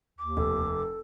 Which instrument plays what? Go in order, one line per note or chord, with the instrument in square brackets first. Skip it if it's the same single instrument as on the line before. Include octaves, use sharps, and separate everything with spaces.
[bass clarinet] D#2 [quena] D6
[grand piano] F1 [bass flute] A4